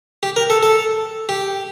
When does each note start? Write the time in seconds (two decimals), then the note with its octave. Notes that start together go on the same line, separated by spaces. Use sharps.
0.23 G4
0.36 A#4
0.50 A4
0.63 A4
1.29 G4